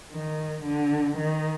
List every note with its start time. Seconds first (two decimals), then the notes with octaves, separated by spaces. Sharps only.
0.12 D#3
0.65 D3
1.18 D#3